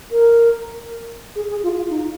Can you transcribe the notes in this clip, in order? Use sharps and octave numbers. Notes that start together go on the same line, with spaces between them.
A#4
G#4
G#4
F4
F4
D#4